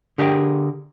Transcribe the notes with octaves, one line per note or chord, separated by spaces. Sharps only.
D3 G4 G#4 A#4 C5 G5